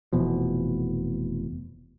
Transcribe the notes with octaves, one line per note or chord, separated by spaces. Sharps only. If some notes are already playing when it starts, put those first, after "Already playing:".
F1 E2 B2 F3